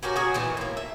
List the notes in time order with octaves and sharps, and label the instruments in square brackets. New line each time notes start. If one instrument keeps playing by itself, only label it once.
[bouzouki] C#4 F#4 G4 A#4
F#4 G#4
A#2 D#3 E3
A2 A#3
E5